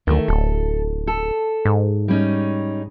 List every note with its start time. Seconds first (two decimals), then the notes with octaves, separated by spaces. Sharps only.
0.07 D2 D#3 A3
0.28 D1 A4
1.07 A4
1.65 G#2
2.08 G3 C#4 D#4